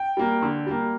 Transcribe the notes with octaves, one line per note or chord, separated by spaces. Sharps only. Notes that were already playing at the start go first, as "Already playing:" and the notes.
Already playing: G5
G3 A#3
D3
G3 A#3